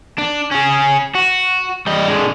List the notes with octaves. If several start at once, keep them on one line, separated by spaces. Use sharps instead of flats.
D4
C#4 G#4
F#4
G3 D#5
D3 G#3